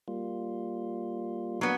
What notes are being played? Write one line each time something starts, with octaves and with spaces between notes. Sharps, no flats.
G3 A#3 F4
F#3 A#3 B3 D4